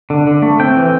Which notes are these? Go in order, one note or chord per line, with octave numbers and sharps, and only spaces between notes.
D3
D3
A3
C4 G5
E3